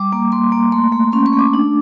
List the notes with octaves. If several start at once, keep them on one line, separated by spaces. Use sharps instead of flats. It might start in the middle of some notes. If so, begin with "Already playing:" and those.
Already playing: G3 D6
A#3
A#3 C6
A#3
A3 C6
A3
C#4 C6
C#6
A3
D6
D4